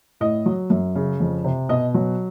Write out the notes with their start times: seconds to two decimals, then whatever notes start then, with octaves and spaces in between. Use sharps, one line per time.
0.20 A2 D#5
0.46 F#3
0.70 F#2
0.95 C#3
1.20 F2
1.44 C3
1.69 B2 D#5
1.94 F#3